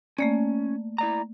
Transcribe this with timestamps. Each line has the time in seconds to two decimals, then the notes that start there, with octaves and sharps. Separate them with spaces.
0.18 A3 A#3 C#4 D5
0.98 E4 D5 A#5